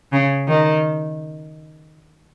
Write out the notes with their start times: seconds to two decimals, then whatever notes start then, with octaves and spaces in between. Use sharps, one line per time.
0.12 C#3
0.48 D#3